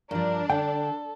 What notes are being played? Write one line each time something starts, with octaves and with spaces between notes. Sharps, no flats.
G2 F3 D4 A#4
D3 A4 G5